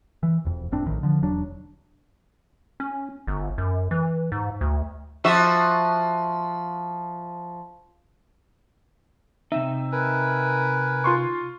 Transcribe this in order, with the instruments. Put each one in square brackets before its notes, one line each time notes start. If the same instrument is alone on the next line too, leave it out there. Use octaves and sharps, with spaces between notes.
[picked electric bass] E3
E1 F2
G1 A2 C4 D4
A#1 A2 D#3
D3 F3
E1 F#3 D4
[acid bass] C#4
G1
F#2
E3
G#2
D2
[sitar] F3 F#4 E5
[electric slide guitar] C3 C4 D#4 [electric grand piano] E5
[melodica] A#4 B4 G#5
[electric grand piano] F4 C6 C#6